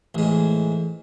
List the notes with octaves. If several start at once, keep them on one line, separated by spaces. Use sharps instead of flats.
A1 G#2